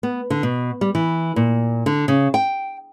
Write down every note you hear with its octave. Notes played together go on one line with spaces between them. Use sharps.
B3
D3
B2
G3
E3
A#2
D3
C#3
G5